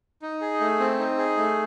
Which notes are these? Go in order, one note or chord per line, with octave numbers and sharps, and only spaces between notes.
D#4
G#4
A3
C4
D#4
G#4
A3